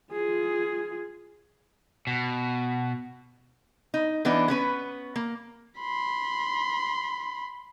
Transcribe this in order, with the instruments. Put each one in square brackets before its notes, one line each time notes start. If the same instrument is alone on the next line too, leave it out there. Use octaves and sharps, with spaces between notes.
[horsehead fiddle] F4 G#4
[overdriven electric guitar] B2
[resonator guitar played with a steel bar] D#4
E3 B3 D4 D#4
B3 C#4 B4
A#3
[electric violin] B5 C6